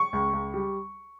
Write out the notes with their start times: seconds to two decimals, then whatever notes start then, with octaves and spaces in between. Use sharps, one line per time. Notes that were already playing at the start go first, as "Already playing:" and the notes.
Already playing: C#6
0.13 C#2
0.33 C#2
0.54 G3